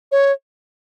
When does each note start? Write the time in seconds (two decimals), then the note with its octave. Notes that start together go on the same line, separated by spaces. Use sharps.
0.12 C#5